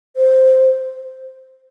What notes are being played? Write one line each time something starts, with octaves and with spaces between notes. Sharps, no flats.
C5